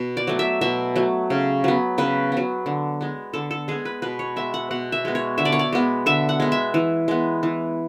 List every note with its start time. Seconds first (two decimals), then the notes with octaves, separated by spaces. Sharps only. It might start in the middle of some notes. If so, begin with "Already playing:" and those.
Already playing: B2
0.17 D5
0.27 F#3 A3
0.39 E5
0.61 B2 E5
0.96 F#3 A3
1.30 C#3
1.64 F#3 B3
1.98 C#3 B4
2.32 F#3 B3
2.66 D3
3.01 G#3 B3
3.33 D3 A4
3.51 A4
3.68 G#3 B3 G#4
3.85 B4
4.02 B2 B4
4.19 C#5
4.36 G#3 B3 E5
4.54 F#5
4.71 B2 F#5
4.92 E5
5.05 G#3 B3
5.15 C#5
5.38 D3 E5
5.45 D5
5.52 C#5
5.59 D5
5.73 G#3 B3
6.06 D3 E5
6.29 F#5
6.40 G#3 B3
6.52 E5
6.74 E3
7.08 G#3 B3
7.43 E3